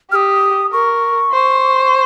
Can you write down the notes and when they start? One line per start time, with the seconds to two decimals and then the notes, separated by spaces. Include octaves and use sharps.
0.12 G4 F6
0.15 D#6
0.72 A#4 C#6
1.33 C5